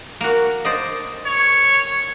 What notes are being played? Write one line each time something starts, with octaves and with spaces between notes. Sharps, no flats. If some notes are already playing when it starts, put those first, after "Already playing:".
A#3 F#4
C5 D5 D#5
C#5